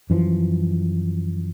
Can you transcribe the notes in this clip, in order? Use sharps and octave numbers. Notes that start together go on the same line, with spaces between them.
F#2 E3 F3